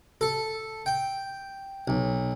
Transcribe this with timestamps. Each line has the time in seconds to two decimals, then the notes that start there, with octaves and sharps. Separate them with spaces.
0.21 A4
0.86 G5
1.88 B1